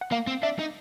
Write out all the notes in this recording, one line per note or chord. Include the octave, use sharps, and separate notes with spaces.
F#5
A#3 F5
C4
D4 E5
D#4